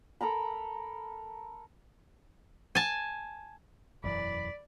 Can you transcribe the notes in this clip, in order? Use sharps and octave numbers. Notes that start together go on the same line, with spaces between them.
A4 A#4 A#5 B5
G#5 A5
E1 F#2 E3 D5 B5